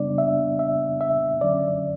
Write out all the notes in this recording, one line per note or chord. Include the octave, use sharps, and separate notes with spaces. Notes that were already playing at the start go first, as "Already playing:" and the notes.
Already playing: C#3 G3 B3 D4 D5
E5
E5
E5
D3 F#3 C#4 D5